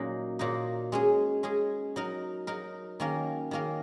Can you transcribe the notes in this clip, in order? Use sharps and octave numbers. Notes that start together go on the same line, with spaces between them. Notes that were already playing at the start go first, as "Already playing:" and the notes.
Already playing: A#2 F#3 A#3 C#4 D#4
A#2 F#3 A#3 D#4
G#3 C#4 G#4
G#3 C#4 G#4
F#3 D#4 A#4
F#3 D#4 A#4
D#3 A#3 C#4 A#4
D#3 A#3 C#4 A#4